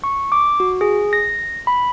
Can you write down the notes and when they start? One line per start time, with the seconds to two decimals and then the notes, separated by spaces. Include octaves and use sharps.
0.04 C#6
0.32 D6
0.60 F#4
0.81 G#4
1.13 A#6
1.67 B5